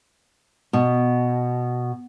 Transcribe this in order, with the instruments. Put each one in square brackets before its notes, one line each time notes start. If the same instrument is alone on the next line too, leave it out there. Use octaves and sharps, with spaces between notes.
[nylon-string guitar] B2